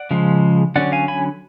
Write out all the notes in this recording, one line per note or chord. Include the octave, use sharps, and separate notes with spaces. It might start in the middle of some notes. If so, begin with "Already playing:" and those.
Already playing: D5 F#5
C#3 F3 G#3
D3 F#3 C#4 D5 F#5
F5 G#5
G#5 B5